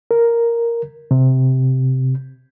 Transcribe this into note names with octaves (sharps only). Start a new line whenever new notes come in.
A#4
C3